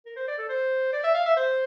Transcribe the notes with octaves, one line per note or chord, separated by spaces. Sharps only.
A#4
C5
D5
A4
C5
D5
E5
F5
E5
C5